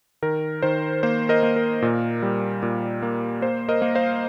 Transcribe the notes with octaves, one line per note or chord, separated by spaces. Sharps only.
D#3 A#4
D#3 C5
A#3 C5
A#4 D#5
A#3
A#4
A#2
G3
A#2
A#3
A#3 C5
A#4 D#5
A#3
C5 F5